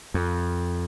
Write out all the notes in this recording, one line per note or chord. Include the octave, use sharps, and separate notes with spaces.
F2